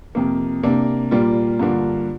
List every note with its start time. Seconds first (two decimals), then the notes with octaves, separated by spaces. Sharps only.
0.15 F2 C3 A#3
0.63 C3 A#3 D4
1.11 A#2 G3 A#3 F4
1.60 G2 D3 F3 A#3